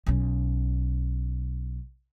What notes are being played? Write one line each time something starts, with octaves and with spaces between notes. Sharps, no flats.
B1 C#4